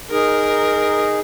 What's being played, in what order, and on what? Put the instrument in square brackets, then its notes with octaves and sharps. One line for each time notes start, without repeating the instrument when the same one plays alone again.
[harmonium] D#4 G#4 [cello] A#4